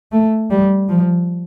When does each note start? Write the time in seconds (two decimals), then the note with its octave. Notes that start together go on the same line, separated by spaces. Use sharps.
0.12 A3
0.51 G3
0.89 F3